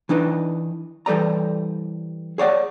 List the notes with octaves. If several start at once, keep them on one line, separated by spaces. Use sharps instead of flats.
E3 D4 D#4 B4
E3 G3 A4 D5 A#5
G#4 C#5 D5 F#5